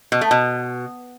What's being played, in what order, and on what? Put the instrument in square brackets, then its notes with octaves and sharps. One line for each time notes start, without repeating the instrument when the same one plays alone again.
[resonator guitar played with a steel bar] B2
A3
B2